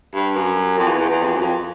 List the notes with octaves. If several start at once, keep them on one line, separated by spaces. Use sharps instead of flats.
G2
F#2
F2
E2
E2
E2
F2
E2
F#2
F2